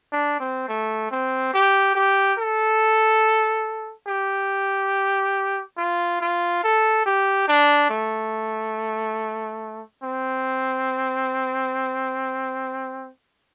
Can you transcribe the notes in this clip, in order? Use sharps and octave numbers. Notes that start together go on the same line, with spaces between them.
D4
C4
A3
C4
G4
G4
A4
G4
F4
F4
A4
G4
D4
A3
C4